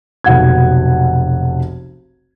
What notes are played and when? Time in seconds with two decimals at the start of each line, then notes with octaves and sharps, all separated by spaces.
0.24 F1 B1 F#5 G#6